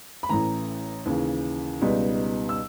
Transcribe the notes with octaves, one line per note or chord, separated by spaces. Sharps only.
B5
A1 A2 E3 A#5
D#2 C#3 E3
C#2 B2 G3 B3 D#4
E6